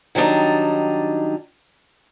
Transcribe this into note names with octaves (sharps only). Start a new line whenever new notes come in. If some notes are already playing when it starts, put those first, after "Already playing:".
D#3 F#3 G3 D4 D#4